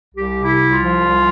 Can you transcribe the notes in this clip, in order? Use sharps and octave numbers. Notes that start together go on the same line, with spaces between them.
C2 G4
C3
E4
C2
F4
F3
C2